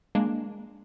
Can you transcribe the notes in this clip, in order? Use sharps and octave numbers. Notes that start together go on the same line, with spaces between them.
G#3 A#3 D4